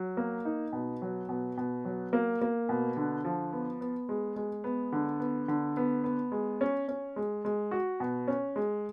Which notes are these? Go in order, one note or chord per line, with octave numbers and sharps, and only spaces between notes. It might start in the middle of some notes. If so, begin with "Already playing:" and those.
Already playing: F#3
A#3
D#4
B2
F#3
B2
B2
F#3
A#3
A#3
B2
D3
F3
B3
B3
G#3
G#3
B3
D3
B3
D3
B3
B3
G#3
C#4
C#4
G#3
G#3
F#4
B2
C#4
G#3